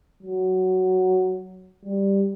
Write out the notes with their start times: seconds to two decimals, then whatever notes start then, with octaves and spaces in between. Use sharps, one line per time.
0.23 F#3
1.85 G3